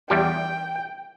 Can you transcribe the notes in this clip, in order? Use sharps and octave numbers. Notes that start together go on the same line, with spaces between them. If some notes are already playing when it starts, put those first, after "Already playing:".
E2 G3 G4 G5